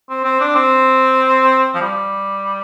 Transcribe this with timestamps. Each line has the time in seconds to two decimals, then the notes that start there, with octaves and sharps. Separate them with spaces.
0.10 C4
0.24 C4
0.40 D4
0.55 C4
1.75 F3
1.81 G3